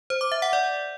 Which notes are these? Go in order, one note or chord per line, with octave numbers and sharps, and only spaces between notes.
C5
D6
E5
F#5
D5